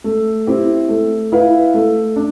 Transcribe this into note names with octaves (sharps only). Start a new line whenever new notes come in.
A3
C4 E4 G4 C5
A3
E4 B4 F5
A3
D4